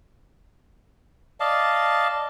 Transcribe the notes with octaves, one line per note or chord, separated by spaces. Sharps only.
D5 D#5 F5 A5